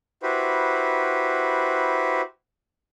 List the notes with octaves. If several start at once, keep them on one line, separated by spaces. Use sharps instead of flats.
E4 F#4 G4 B4 C5